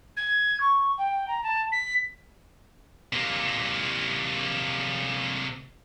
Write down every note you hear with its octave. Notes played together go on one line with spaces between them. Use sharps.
G#6
C#6
G5
A#5
A5
B6
C3 A#3